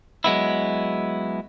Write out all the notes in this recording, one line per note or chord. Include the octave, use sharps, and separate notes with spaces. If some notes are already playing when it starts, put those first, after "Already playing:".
F#3 G#3 B3 E4